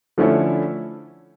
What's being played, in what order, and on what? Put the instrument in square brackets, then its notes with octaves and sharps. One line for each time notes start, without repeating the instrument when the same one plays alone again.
[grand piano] D3 F3 A3 C#4 E4